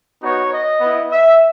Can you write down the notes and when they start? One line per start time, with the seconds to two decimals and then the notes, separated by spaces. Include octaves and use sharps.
0.22 B3 D#4 F#4 C#5
0.52 D#5
0.81 B3 E4
1.11 E5